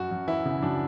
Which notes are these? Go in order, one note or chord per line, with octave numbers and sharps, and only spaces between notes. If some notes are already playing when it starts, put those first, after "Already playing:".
Already playing: F#2 F#4
F#2
E3 E4
C#3
F#2 D4